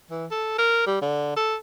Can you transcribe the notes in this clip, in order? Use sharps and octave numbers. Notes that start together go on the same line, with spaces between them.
E3
A4
A#4
G3
D3
A4